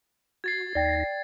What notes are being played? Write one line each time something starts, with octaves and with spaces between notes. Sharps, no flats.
F#4 G#6 A6 C7
D#2 D#4 D5 G5 A#6